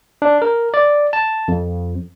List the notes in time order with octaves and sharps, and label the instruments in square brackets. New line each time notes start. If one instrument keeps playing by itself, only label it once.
[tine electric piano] D4
A#4
D5
A5
F2